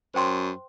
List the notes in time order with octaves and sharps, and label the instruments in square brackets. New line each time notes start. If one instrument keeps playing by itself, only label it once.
[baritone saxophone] F#2 [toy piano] C5 G5 C6